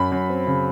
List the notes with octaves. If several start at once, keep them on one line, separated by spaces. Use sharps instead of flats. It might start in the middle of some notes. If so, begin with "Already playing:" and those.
Already playing: F#2 B5
F#2
C4
C#3